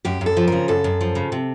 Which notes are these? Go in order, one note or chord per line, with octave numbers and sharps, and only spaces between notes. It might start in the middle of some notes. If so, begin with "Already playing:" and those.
F#2 G4
F#2
A4
F3
C#3 A#4
F#2 A4
F#2
F3
C#3
C3